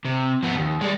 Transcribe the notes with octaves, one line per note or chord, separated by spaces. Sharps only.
C3
F3 B3
D#2
G3 G#3